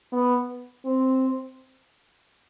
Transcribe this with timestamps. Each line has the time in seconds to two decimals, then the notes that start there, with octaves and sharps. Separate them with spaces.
0.13 B3
0.86 C4